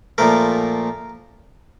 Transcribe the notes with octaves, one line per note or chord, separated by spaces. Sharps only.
A#2 F3 A3 A#4